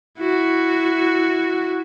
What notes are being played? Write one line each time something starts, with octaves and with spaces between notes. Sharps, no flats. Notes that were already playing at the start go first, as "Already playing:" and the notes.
E4 F#4